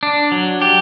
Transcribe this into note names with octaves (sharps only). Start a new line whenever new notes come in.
D4
F#3
G4